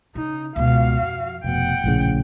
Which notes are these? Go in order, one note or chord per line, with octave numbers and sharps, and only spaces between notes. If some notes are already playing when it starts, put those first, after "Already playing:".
C#3 D#4
C#2 B2 F#4 F5
F2
F1 D2 B2 F#5 G5
A#1 A2 C#3